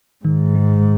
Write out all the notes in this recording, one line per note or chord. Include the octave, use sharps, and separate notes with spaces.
G#2 D#3
G#3